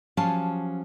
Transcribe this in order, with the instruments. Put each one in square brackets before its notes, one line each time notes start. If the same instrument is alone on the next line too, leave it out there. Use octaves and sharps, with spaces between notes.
[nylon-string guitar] F3 F#3 C#4 G4 F5 A5